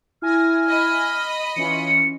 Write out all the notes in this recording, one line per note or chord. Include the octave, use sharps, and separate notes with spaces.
E4 G#5 F6 A#6
D#5 B5
E3 C#4 F4 C#7